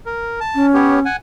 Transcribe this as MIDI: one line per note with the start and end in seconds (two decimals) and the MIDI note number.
0.06 0.40 70
0.40 0.66 81
0.55 1.04 61
0.74 1.00 59
0.74 1.00 67
0.74 1.00 73
1.05 1.16 78
1.05 1.16 80